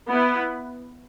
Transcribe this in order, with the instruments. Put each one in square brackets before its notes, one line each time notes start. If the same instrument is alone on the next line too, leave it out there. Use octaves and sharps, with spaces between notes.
[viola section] B3 E4 B4